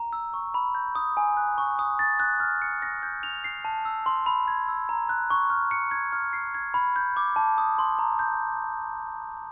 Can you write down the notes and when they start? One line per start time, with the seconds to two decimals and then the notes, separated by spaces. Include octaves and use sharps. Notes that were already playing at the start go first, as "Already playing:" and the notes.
Already playing: A#5
0.13 E6
0.34 C#6
0.54 B5
0.75 G6
0.95 D#6
1.17 G#5
1.37 F#6
1.58 C#6
1.79 D#6
1.99 A6
2.20 F#6
2.40 F6
2.62 C#7
2.82 A#6
3.03 G6
3.23 F7
3.44 C7
3.65 A5
3.85 E6
4.06 C6
4.26 B5
4.48 G#6
4.68 E6
4.89 A#5
5.09 F#6
5.30 C#6
5.50 F6
5.71 C#7
5.91 G#6
6.12 F6
6.33 C7
6.55 G#6
6.74 B5
6.96 G6
7.17 D6
7.36 A5
7.58 D#6
7.79 C6
7.99 A#5
8.19 G6